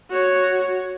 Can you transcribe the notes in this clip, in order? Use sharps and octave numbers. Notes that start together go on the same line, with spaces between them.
F#4 C#5